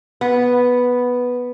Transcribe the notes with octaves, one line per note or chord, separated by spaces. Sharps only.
B3